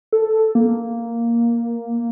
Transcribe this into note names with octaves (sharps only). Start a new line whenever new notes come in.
A4
A#3